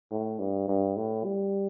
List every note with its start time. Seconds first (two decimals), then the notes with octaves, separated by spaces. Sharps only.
0.11 A2
0.39 G2
0.68 G2
0.96 A2
1.24 G3